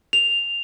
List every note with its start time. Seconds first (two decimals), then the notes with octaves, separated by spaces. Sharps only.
0.13 F7